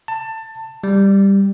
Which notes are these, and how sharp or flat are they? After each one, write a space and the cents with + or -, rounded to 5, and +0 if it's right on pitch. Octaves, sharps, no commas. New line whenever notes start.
A5 +20
G3 +10